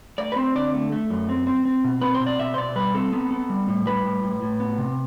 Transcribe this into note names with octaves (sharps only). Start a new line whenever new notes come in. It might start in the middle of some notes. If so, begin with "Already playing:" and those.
A3 D5
B4
C4 C5
D3 D5
A3
A3
F#2
C4
C4
C4
B2
C4 B4
C5
B2
D5
B2 E5
C5
B2 D5
G3 B4
C4 A4
B3
B3
G3
A2
G3 B4
A2
A2
A2
B3
C3